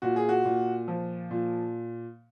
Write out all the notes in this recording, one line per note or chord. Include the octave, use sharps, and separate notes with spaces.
A#2 F#4
G#4
F#4
A#2
F3
A#2